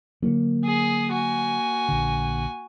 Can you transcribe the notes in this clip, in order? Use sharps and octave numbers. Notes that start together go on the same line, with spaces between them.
D3 F#3 A#3
G#4 D#6
F#4 G#5
A#1 D3